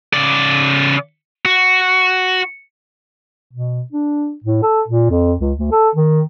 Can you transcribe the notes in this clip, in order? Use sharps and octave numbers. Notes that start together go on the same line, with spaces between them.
C#3 D5
F#4
B2
D4
A2
A4
A#2
F2
C#2
D2
A4
D#3